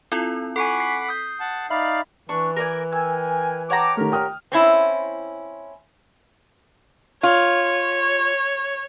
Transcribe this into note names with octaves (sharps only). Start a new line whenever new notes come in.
C4 E4 F4 A4
A4 F#5 G#5 B5 C#6 D6 C7
B6 C7
D#6 G6
F#5 A5
D#4 D5 E5 F5 B5
E3 D4 C#6
A#4 D5 G#5
A#4 G5 G#5 E6
C#5 F#5 G5 A5 A#5 D6
D#3 A3 G4 A#4
G5 D#6 F6
C4 C#4 E4
F4 C#5